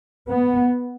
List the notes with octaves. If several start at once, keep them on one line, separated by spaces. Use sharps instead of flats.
B3